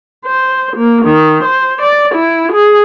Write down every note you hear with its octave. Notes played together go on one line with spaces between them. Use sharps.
C5
A#3
D#3
C5
D5
E4
G#4